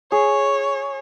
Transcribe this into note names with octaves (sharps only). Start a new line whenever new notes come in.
G#4 C#5